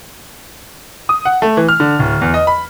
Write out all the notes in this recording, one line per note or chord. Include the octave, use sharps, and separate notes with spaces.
D#6
F#5
A3
E3
F6
D3
D1
E2
D#5
B5